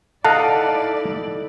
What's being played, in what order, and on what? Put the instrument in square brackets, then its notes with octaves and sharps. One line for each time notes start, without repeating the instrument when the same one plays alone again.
[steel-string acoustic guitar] D#4 A4 [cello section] E4 D5 [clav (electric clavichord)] D#5 F5 F#5 [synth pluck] A5